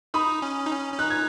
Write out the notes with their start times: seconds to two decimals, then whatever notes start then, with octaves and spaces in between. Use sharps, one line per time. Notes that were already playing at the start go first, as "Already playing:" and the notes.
0.14 D#4 B5 D#6
0.42 C#4
0.66 D#4
0.71 C#4
0.93 C#4
0.99 D#4 F#6
1.10 G#6